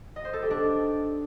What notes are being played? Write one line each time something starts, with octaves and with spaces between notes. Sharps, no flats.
D#5
C5
A4
G4
D4